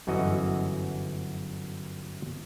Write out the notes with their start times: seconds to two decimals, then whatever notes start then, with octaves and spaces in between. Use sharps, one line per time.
0.07 G1 F#2 E3 F#4 D#5